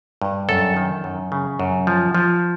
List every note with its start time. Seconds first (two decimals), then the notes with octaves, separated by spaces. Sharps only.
0.22 G2
0.49 F#2 A4
0.77 D#3
1.04 F#2
1.32 C#3
1.59 F#2
1.87 F3
2.15 F3